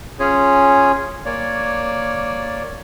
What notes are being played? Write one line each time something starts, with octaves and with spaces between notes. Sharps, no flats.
C#4 F4 G#4 C#5
A#3 C#5 D5